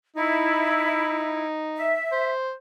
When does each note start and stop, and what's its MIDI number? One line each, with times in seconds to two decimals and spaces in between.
0.16 1.98 63
0.16 1.46 64
1.77 2.31 76
2.12 2.53 72